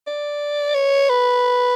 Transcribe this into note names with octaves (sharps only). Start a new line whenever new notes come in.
D5
C#5
B4